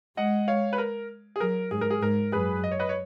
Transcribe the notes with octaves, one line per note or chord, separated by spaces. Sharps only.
G#3 D#5 F#5
C#5 F5
B4
A#4
G#4
F#3 A#4
G#2 G#4
A#4
G#4
G#2 A#4
F#2 G#4 B4
D#5
C#5
B4 D#5
C#5